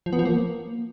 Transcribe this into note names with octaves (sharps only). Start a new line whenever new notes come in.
F3
B3
F3
A#3